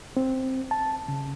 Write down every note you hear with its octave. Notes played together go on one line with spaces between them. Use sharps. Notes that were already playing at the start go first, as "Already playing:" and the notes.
C4
A5
C#3